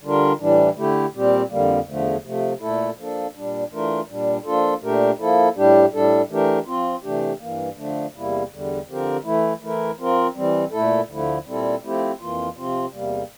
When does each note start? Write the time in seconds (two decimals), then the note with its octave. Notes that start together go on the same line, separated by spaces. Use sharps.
0.03 D3 G3 D4 F4 A#4
0.39 A2 E3 G3 D4
0.76 D3 A3 E4 G4
1.14 A#2 G3 C4 G4
1.50 F2 D3 G3 A#3
1.87 E2 D3 F3 A3
2.24 C3 F3 A3
2.60 A#2 A3 E4 A4
2.97 F3 A#3 D4 A4
3.35 A#2 G3 D4
3.71 E3 A3 D4 F4 A#4
4.08 A#2 G3 D4
4.45 F3 A#3 D4 F4 A4
4.81 A#2 A3 D4 G4 A#4
5.19 F3 A#3 E4 A4
5.56 A2 G3 D4 G4
5.92 A2 G3 D4 A4
6.30 E3 A3 D4 G4 A#4
6.67 F3 C4 F4
7.03 C3 E3 A3 D4 G4
7.39 G2 E3 A#3
7.76 D3 F3 A3 D4
8.14 E2 C3 G3 A#3 E4
8.50 E2 D3 G3
8.88 D3 F3 C4 G4 A#4
9.24 E3 A3 E4
9.61 E3 A3 E4 A#4
9.98 F3 C4 F4 A#4
10.35 E3 G3 C4
10.71 A#2 A3 E4 A4
11.08 D2 D3 F3 A3 E4
11.46 A#2 G3 C4 E4 A4
11.83 F3 A3 C4 E4 G4
12.19 F2 E3 A#3 F4
12.56 C3 F3 C4 F4
12.93 E2 C3 G3 A#3